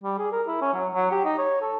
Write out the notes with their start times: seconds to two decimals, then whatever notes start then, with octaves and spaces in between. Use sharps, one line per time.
0.03 G3
0.18 G#4
0.32 A#4
0.47 E4
0.61 C#4
0.74 F#3
0.94 F#3
1.11 G4
1.25 D#4
1.38 C#5
1.61 A4